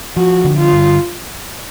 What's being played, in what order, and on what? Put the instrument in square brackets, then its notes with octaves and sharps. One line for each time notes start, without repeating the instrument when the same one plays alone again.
[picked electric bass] F3 [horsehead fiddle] F#4
[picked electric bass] D3
[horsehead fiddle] F4
[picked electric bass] G2